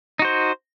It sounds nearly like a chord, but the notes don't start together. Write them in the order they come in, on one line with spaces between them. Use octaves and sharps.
D#4 F#4 C5